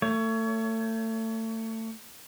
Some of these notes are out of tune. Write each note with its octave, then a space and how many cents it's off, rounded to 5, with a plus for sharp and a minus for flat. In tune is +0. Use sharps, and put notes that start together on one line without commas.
A3 +30 C#5 +25